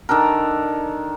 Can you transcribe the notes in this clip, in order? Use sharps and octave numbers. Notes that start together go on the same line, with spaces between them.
D#3 D4 A4 A#4